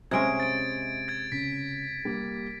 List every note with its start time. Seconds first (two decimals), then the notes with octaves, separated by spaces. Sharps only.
0.11 C3 G#3 C#4 D#5 E5 G#6 D7
0.40 A6 D7
1.08 G#6 A6
1.32 C#3 B6
2.05 G3 A#3